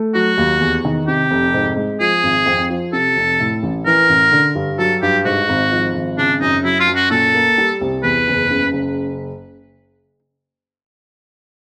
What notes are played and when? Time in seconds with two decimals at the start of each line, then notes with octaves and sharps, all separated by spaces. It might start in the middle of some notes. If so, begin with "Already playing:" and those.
Already playing: A3
0.14 F#3 F#4
0.38 D#2
0.60 E2
0.85 D#3
1.07 C3 G4
1.31 F1
1.54 G#2
1.77 G#3
2.00 F3 G#4
2.23 G#1
2.46 F2
2.70 F3
2.93 C3 A4
3.17 F1
3.40 A2
3.63 A1
3.86 E3 A#4
4.09 A1
4.32 D3
4.55 G2
4.79 F#3 A4
5.02 G2 G4
5.25 G#2 F#4
5.49 G#1
5.72 F3
5.94 G#1
6.18 C#3 D4
6.41 F#2 D#4
6.64 F#3 E4
6.80 F4
6.87 F#2
6.96 F#4
7.10 A#2 A4
7.35 A#3
7.58 G3
7.81 C2
8.03 E2 B4
8.27 F#1
8.50 C#3
8.73 F#1